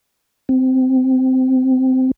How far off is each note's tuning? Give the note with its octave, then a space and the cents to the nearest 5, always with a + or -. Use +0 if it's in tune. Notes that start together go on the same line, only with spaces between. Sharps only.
C4 -15